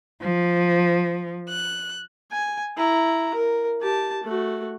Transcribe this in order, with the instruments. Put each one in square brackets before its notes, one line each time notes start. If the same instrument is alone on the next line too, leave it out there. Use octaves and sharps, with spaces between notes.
[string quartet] F3
F#6
[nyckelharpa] G#5
E4 A#5
A#4
G4 A5
A3 F#4